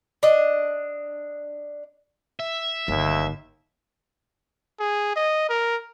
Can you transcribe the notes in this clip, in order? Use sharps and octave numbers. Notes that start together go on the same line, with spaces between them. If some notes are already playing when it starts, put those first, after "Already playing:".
D4 D#5
E5
G1 D#2
G#4
D#5
A#4